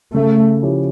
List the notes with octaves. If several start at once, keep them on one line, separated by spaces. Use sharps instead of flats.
C#3 A3
F3 C#4 E4 G4